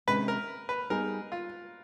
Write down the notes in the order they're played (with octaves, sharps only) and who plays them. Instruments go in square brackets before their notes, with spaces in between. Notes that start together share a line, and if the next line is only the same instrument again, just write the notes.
[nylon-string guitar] C3 D#3 G#3 C#4 [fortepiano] B4
[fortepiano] A#4
B4
[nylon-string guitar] G3 B3 D#4 G#4 [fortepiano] A#4
[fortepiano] F4